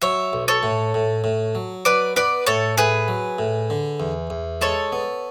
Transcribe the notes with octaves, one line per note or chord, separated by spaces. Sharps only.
F#3 C#5 E5
B1
A4 C#5
A2
A2
A2
F#3
F#3 B4 D5
B3 B4 D5
A2 A4 C#5
A2 G#4 B4
F#3
A2
D3
E2
E2
G#3 A4 C#5
B3